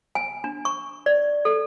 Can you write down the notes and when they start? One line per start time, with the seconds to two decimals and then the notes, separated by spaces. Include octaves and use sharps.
0.15 G#5
0.44 D4
0.65 C#6
1.06 D5
1.45 A4